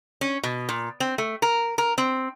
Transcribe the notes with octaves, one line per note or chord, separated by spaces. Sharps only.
C#4
B2
A#2
C4
A3
A#4
A#4
C4